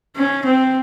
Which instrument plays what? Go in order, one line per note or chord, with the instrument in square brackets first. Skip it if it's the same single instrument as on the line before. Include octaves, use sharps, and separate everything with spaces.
[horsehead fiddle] C#4
C4